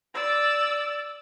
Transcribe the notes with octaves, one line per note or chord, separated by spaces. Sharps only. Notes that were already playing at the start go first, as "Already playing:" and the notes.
D5 E6